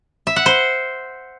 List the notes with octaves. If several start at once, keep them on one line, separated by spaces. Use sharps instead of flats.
E5
F#5
C5